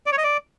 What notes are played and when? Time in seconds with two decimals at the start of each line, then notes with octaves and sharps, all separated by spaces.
0.06 D5
0.12 C#5
0.18 D#5
0.24 D5